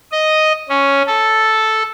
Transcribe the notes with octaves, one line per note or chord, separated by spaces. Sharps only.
D#5
C#4
A4